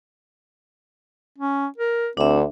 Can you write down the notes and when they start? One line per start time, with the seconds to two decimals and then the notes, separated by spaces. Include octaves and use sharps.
1.38 C#4
1.78 A#4
2.17 D2 C4 D4 E5